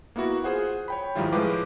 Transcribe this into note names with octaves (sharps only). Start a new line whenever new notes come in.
A#3 B3 E4 F#4
F4 G#4 C5 F#5
C#5 G5 B5
G#2 D#3 F3 G3 E4 F4
A2 F3 G#3 B4 F5 D6